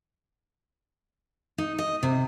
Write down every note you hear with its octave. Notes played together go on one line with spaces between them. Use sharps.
D#4
D#5
C3